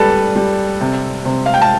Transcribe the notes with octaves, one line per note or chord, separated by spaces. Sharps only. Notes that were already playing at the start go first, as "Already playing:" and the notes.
Already playing: G3 D4 A4 B4 A5
G3
C3
C3
F5
G5
A5